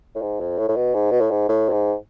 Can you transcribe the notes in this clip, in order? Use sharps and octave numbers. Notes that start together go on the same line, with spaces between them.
A2
G#2
F2
A2
A2
B2
G#2
B2
A2
G#2
A2
F2
G#2